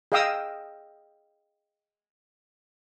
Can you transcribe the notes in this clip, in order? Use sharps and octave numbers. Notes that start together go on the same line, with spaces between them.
G#4 D#5 F5 G5 D#6 E6